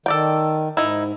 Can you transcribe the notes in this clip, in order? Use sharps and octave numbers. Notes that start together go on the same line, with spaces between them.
D#3 A4 D5 G5
G#2 D#4 E4